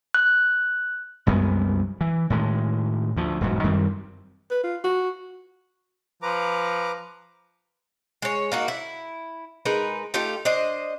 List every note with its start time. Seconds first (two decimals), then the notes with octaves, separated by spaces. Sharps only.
0.14 F#6
1.27 C2 F#2 G#3 B3
2.01 E3
2.30 A2 D#3 G#3
3.16 D2 F3
3.41 E1 G#2 F#3
3.64 F#2 D#3 G3 C4
4.51 B4
4.63 F4
4.84 F#4
6.22 F3 B4 A#5 D6
8.22 G#3 C#5
8.52 A#3 D#4 F#4
8.68 E4
9.65 G#3 D#4 A#4 B4
10.14 A3 D#4 F4 G4
10.45 D4 C5 D#5